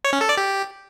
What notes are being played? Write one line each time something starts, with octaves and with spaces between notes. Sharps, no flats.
C#5
C#4
A4
D5
G4